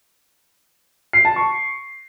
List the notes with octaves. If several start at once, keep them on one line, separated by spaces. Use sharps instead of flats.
C7
A5
C#6